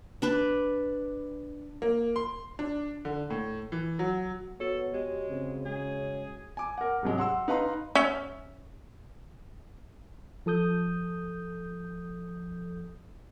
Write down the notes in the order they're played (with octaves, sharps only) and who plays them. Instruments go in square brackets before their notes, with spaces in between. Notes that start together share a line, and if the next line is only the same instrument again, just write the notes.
[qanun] D4 B4 D5
[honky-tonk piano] A#3
C6
D4
D3
A2
E3
F#3
[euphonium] B3 [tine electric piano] F#4 C#5 [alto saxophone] A4
[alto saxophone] G#3 [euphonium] G4
[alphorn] C#3 [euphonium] C4
[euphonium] G#3 [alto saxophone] G#4
[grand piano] G#5 D6
A#4 F#5
G#2 C3 F#3 G#3
F#5 C6 E6
D#4 B4 F5 A#5 C6
[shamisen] C#4 E5
[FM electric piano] F3 A4 D#6 G6